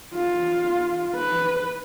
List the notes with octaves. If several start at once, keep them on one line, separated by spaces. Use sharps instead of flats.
F4
B4